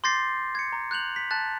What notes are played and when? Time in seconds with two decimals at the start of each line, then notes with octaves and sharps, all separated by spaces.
0.04 C6 D6 G6 A6 A#6 C7
0.55 G#6 C#7
0.72 A#5
0.91 F#6 G6 F7 F#7
1.16 B6
1.31 A5 F#6 A6